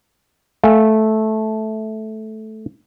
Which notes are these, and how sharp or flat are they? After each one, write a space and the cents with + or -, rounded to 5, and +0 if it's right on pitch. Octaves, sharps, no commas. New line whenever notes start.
A3 -10 F5 +0 G#5 +0